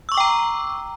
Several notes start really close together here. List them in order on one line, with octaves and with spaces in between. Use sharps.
E6 C#6 D6 G5 A#5